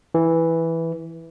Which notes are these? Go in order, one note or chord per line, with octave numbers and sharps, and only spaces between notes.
E3